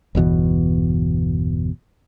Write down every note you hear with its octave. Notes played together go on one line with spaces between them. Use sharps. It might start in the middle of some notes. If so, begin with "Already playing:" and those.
G1 E2 B2 E3